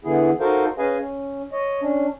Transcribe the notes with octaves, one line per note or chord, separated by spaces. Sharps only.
D3 E3 B3 E4 G#4
D#4 F#4 A4 A#4 C5 F5
C#4 G#4 B4 D#5 F5 G#5
C#4
C#5 D#5
C#4 D4